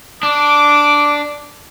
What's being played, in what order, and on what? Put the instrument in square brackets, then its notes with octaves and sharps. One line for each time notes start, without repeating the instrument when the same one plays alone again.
[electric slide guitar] D4 [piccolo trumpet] D6